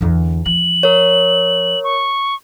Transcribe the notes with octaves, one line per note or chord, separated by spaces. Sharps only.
E2 D3
F3 F#7
A#4 C#5
C#6